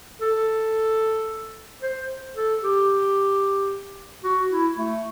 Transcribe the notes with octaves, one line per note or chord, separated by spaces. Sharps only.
A4
C5
A4
G4
F#4
E4
A3